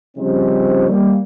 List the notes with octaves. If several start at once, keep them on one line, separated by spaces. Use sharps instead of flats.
C#3 F3 G3 C4 C#4 D#4
G3 A#3